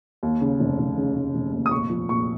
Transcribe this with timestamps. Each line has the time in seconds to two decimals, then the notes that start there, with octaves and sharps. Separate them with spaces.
0.23 D#2
0.41 C#3
0.60 F1
0.79 F1
0.98 C#3
1.16 F1
1.35 F1
1.53 D#2
1.66 D#6
1.71 A#2 C#6
1.90 F3
2.09 A#1 C#6